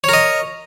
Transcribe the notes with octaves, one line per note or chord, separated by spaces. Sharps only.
A#4 C#5 D#5